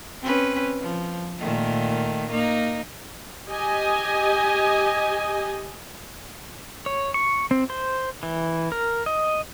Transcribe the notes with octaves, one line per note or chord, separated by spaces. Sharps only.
C4 C#4 B4
F3
A#2 D#3 A3
A#3 D#4
G4 D#5 G#5
C#5
C#6
C4
C5
E3
A#4
D#5